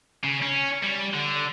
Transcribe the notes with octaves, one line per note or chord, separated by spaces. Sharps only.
C#3
C#4
G3
D3